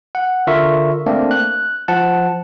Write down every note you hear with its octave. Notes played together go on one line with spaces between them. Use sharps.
F#5
D3 F4 A#4 E5 C#6
A3 A#3 C4 D4
F#6
F3 F#5 A5